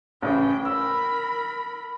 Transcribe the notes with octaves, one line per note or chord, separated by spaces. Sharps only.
A1 C#3 B4 G5
A#4 B5 E6